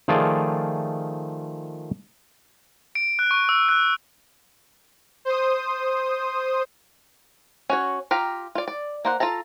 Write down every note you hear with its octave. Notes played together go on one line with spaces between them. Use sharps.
D#3 F3 A3 F4 G#4 D5
D7
F#6
C#6
E6
F#6
C5 D#6
C#4 F#4 C#5
F4 G4 F5 G5 A#5
F4 D5
D5
A#3 C5 F#5
F4 A4 A5 A#5